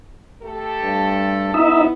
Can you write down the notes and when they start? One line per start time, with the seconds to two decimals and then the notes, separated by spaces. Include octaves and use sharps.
0.43 A3 G4 A4
0.83 G2
1.54 B3 D#4 E4 E5